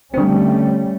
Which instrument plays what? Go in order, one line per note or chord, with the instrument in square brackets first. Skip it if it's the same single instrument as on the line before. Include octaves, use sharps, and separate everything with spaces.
[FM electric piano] D3 C4 [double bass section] G3 A3 C#4